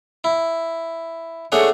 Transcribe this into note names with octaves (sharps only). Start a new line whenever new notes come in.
E4
A3 D4 G#4 C#5 F#5